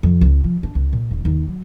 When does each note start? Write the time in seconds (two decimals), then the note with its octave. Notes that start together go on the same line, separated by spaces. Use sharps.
0.03 F2
0.21 C#2
0.44 F3
0.63 D4
0.75 C#2
0.93 A#2
1.11 D#1
1.25 D#2
1.47 F#3